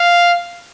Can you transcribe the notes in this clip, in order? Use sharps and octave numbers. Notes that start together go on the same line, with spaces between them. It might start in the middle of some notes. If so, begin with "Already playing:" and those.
Already playing: F5